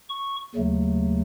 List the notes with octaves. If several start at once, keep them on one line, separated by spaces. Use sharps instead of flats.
C#6
D#2 C#3 F#3 A3